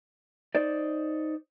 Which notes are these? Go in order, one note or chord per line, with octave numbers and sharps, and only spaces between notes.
D#4 C5 D5